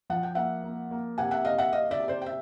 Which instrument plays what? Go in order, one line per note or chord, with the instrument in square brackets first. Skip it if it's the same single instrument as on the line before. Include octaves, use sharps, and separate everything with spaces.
[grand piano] F3 [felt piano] F#5
[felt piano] G5
[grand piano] A#3 [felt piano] E5 F#5
[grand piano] A#3
A#3
[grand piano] C3 [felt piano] F#5 G#5
[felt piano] E5 F#5
[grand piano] C3 [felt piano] D#5 F5
[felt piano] E5 F#5
[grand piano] C3 [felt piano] D#5 F5
[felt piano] D5 E5
[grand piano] C3
[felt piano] C5 D5
G5
E5